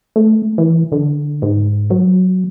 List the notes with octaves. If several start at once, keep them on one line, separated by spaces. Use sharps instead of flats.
A3
E3
D3
G#2
F#3